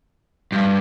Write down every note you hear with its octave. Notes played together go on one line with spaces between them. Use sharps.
G2